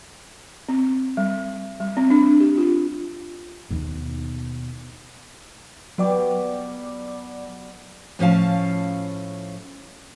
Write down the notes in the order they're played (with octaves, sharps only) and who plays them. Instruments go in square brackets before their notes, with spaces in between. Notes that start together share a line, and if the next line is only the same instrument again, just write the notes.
[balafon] C4
G3
G3
C4
D4
G4
F4
[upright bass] D#2 B2
[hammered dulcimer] B2 G3 [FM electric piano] F#3 D5 D6
[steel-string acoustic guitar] A2 F3 C#4 F5 A5